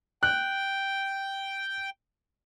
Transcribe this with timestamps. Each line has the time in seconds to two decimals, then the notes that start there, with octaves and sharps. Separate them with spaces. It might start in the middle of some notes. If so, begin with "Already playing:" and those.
0.23 G5 F#6